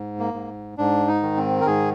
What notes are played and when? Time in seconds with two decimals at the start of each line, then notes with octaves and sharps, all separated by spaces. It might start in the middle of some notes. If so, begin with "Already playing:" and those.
Already playing: G#2
0.19 A#3
0.34 G#2
0.78 G#2 D4
1.08 D#4
1.23 D#3
1.37 C4
1.61 A#4
1.66 G#2 G#4